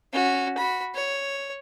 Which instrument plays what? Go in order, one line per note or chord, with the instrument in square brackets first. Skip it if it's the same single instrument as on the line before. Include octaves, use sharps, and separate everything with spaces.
[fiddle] C#4 F#4
F#4 B5
C#5